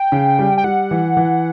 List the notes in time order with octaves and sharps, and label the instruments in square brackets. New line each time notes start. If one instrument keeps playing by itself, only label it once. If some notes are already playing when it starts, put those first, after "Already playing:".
Already playing: [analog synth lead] G5
[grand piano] C#3
G3
[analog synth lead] G5
[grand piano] G3 [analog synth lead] F#5
[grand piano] E3
E3